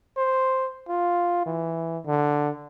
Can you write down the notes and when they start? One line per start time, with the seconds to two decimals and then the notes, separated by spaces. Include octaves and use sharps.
0.17 C5
0.88 F4
1.46 E3
2.06 D3